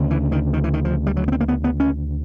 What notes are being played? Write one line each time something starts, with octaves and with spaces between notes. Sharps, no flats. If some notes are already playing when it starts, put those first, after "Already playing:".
Already playing: D2 C#3
E3
D#3
D#3
E3
D#3
F3
G3
F#3
B3
C4
A#3
B3
B3
C#4